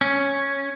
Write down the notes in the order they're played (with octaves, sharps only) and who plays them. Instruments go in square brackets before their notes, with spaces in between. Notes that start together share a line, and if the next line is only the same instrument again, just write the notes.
[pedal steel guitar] C#4